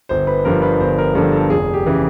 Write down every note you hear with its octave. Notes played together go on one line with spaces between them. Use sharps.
G1 C5
B4
G2 D3 F3 A#4
B4
G1 C5
A#4
G2 D3 F3 A4
A4
F1 G#4
G4
C#3 E3